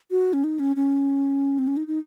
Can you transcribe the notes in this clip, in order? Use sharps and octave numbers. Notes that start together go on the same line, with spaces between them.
F#4
C#4
D#4
C#4
C#4
C4
C#4
D#4
D#4